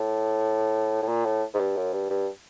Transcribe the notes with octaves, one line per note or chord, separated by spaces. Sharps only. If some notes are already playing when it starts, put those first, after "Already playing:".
Already playing: A2
A2
A#2
A2
G#2
G2
F#2
G2
G2